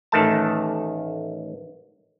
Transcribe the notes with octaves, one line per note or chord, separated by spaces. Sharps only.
A1 D#3 A3 A5